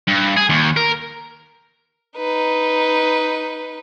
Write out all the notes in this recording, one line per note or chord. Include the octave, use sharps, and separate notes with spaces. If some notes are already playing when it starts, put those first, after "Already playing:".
G2
G#4
D#2
A#4
D#4 B4